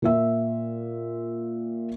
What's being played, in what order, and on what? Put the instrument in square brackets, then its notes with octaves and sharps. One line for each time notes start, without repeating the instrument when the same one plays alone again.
[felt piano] A#2 F4 E5